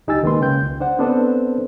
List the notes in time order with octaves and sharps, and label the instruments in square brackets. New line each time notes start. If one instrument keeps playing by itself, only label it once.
[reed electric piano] C#2 D#4 G4 G#5 E6 A6
D2 D#3 G#3 A#3 B4 C6
C#3 G5 G6
C#2
D4 C5 F#5
B3 C4 D4 A4 B4 C5